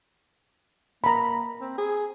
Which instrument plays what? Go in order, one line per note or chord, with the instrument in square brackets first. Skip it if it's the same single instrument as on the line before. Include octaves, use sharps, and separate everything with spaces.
[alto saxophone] A#3 [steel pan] A#5 B5
[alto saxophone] C4
G#4